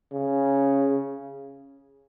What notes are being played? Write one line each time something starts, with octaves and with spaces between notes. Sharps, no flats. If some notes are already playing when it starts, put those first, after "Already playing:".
C#3